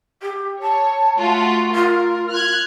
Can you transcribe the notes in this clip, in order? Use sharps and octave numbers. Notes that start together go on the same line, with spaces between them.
G4
C#5 A5
A3 F4 F#4
F4 A#4
F6 F#6 G#6